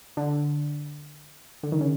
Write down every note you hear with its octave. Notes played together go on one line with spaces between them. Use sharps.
D3
D3
D#3
C#3